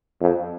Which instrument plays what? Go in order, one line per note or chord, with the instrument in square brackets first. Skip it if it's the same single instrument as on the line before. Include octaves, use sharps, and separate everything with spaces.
[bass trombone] F2